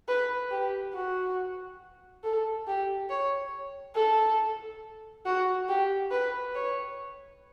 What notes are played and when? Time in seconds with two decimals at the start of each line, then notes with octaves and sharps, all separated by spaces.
0.08 B4
0.51 G4
0.94 F#4
2.24 A4
2.67 G4
3.10 C#5
3.96 A4
5.26 F#4
5.69 G4
6.11 B4
6.55 C#5